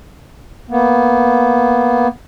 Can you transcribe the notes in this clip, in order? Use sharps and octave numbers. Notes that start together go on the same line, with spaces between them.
A#3 B3